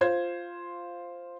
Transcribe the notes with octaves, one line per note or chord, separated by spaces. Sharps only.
F4 C5 G#6